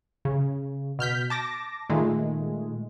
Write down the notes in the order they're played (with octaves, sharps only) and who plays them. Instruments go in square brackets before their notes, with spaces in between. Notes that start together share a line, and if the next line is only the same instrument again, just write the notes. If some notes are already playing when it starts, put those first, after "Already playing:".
[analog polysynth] C#3
B2 F6 G6 B6
A5 D6 A#6
A#2 D#3 G#3 A3